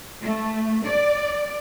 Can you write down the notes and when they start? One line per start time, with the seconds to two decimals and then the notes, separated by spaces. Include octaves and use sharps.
0.23 A3
0.86 D5